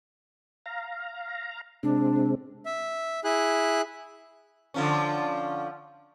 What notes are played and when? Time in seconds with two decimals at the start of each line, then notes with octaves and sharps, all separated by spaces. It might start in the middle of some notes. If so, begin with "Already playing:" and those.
0.66 F5 A#5
1.83 C3 G#3 C4 D4
2.66 E5
3.24 E4 G#4 F#6
4.74 D3 F3 C#4